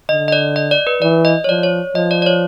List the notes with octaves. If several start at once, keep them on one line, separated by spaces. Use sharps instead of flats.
D3 D#5
D#5
D5
D#5
D5
B4
E3 D5
D#5
C#5
F3 D5
C#5
F3 D#5
D5
D5
C#5